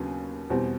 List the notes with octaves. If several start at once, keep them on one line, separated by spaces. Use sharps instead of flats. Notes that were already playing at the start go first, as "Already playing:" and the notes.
Already playing: D#2 C#3 F#3 B3 D4 G#5
E2 B2 G3 C4